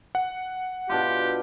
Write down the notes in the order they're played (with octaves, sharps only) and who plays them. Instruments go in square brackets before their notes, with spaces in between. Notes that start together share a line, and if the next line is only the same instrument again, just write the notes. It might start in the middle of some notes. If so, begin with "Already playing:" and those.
[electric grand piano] F#5
[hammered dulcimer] B2 D4 F4 [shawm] G4